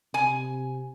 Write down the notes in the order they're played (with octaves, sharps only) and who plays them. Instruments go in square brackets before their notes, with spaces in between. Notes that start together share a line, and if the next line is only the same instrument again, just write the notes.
[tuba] C3 [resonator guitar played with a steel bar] G#5